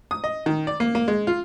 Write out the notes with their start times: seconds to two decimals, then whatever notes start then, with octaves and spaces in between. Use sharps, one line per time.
0.11 D#6
0.24 D#5
0.46 D#3
0.67 D5
0.80 A#3
0.95 A#3
1.08 G#3
1.27 F4